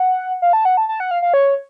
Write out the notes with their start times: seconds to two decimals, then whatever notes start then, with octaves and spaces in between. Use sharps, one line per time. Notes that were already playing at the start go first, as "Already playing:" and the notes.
Already playing: F#5
0.42 F5
0.53 A5
0.65 F#5
0.77 A5
0.89 A5
1.00 F#5
1.11 F5
1.22 F5
1.34 C#5